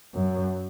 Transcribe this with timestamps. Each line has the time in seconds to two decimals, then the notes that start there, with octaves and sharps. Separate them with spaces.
0.15 F#2